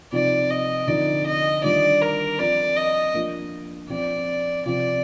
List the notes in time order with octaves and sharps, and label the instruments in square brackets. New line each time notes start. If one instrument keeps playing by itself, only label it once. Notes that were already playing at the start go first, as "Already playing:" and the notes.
[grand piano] C3 F3 C4 D#4 [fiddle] D5
[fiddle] D#5
[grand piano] D3 F3 C4 D#4 [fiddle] D5
[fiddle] D#5
[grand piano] D#3 G3 D4 F4 [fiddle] D5
[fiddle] A#4
[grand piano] F3 C4 F4 [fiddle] D5
[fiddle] D#5
[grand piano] F3 A#3 D4 F4
[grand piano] F3 C4 F4 [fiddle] D5
[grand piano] C3 F3 C4 [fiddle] D5